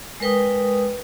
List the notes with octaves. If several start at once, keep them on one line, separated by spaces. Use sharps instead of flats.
G#3 A#4 B4 G5 D#6